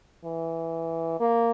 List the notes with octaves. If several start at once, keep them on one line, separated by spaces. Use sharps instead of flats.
E3
A#3